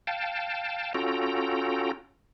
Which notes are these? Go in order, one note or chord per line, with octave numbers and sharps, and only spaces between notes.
F5 G5 A5
C#4 F4 F#4 A4 G5 A#5